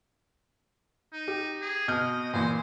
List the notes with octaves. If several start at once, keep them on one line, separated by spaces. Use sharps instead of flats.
D#4
G4
G#4
B2 D#5 F6 G6
A#2 E3 C5